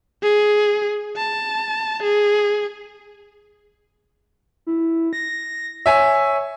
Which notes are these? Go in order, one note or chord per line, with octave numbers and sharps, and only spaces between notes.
G#4
A5
G#4
E4
A#6
C#5 E5 G#5